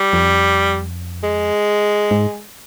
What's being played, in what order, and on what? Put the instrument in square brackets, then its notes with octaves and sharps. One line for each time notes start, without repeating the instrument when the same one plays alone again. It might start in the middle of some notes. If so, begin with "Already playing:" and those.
Already playing: [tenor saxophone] G3
[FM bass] F2
[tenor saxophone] G#3
[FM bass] G#2